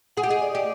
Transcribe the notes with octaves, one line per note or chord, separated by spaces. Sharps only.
G#4 F#5
G4
G#4 D#5
D5
G4 D5